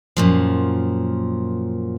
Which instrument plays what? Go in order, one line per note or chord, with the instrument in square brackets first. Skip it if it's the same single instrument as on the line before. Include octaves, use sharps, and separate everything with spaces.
[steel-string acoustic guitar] F#2 A#2 F3